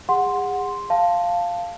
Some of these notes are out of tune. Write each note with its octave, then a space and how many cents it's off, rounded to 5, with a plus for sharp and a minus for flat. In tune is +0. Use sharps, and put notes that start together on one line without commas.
G#4 -35 F#5 -10 C6 +0
F5 +0 A5 +0